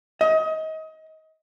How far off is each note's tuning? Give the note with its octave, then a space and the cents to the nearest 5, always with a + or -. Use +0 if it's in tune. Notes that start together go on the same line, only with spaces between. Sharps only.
D#5 +25